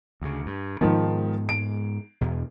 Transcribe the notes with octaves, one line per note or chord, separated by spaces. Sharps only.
D2 C#3
G2
G#2 D#3 F3 G#3 B3
D7
E2 B2